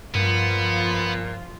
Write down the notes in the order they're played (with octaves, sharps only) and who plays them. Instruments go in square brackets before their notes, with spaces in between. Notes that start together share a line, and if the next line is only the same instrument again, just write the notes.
[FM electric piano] G2 [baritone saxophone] A#2 [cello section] F3 F4 [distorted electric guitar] B3